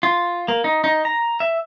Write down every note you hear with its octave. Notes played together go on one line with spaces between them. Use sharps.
F4
A#3
D#4
D#4
A#5
E5